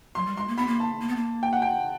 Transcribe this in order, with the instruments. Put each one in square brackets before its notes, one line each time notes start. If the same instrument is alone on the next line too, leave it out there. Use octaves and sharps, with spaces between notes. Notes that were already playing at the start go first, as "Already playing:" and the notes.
[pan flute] F#3 [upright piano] C6
[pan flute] G3
[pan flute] G#3 [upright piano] C6
[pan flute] A#3
[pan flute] B3 [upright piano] B5
[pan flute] A#3
[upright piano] A5
[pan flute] A#3
B3
A#3
[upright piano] G5
F#5
G5